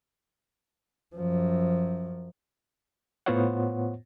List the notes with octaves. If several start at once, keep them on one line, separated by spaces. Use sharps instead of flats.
F#2 F3
A2 B3 F4 C5 C#5 F#5